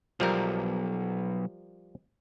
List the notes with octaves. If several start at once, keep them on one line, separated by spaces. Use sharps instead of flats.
B1 F3 G3 A#4